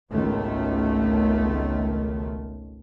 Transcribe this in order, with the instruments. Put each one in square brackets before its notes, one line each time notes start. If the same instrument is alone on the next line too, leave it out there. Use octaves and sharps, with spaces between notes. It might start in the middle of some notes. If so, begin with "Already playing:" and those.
[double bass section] G#1 C#2 B2 D#3 A3